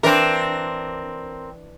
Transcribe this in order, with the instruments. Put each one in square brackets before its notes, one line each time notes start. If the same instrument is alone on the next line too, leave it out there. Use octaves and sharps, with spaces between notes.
[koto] E3 D4 [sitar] C4 A#4